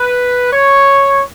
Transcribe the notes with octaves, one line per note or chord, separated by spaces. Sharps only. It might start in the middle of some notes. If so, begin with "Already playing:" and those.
Already playing: B4
C#5